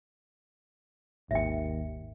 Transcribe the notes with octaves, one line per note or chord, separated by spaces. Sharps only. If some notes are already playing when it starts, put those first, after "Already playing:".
G#1 D#2 E5 G5